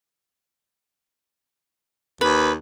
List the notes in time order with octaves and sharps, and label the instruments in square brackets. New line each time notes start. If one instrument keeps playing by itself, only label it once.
[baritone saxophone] D#2 [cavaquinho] B4